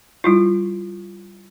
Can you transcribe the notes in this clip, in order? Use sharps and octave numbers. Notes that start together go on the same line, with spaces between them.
G3 E4 F4